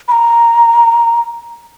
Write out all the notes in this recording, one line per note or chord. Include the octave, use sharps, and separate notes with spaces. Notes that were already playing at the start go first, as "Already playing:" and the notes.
B5
A#5